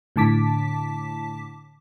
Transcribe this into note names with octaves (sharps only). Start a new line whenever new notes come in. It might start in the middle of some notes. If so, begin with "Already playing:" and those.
A2 D3 A5 D6 B6